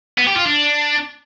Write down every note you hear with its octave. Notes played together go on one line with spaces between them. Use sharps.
B3
G4
F4
D4